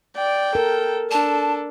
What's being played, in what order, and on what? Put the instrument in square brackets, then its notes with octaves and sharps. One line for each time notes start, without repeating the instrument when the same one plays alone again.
[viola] D5 [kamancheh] G5
[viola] A4 [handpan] A#4
[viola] D4 [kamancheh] A4 [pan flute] A5